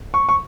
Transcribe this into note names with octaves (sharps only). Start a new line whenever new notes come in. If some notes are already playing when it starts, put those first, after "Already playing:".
C#6
C#6